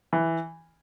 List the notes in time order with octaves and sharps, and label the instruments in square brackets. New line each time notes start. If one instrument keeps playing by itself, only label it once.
[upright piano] E3